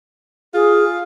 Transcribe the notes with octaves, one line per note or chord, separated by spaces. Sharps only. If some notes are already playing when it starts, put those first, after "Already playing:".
F4 G#4